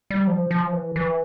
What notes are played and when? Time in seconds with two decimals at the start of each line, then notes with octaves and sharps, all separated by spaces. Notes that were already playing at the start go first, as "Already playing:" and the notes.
0.10 G3
0.27 F3
0.51 F3
0.73 E3
0.96 E3